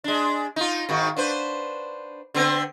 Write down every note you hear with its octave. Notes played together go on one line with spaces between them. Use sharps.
G#3 D4
D#4 F4
G#2 D#3 F#4
D4 B4 C5
D3 B3 C4